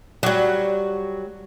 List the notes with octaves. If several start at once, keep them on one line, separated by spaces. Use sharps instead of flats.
F#3 G3